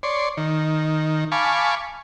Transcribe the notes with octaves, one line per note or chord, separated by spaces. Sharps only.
C#5 D5 C6
D#3
F5 G#5 A5 B5 C#6 D6